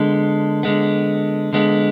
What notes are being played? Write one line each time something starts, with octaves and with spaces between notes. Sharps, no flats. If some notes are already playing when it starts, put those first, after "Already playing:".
Already playing: D3 G#3 B3
D3 G#3 B3
D3 G#3 B3